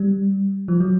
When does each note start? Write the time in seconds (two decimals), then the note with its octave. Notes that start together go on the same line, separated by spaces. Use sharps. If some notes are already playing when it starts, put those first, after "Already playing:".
Already playing: G3
0.68 F3
0.80 F#3